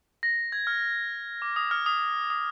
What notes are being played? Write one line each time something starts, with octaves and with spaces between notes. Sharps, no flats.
A#6
G#6
F6
D6
D#6
F6
D#6
D#6